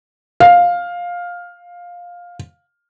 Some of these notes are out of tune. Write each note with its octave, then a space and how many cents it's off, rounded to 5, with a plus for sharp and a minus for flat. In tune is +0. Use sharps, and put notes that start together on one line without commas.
F5 +10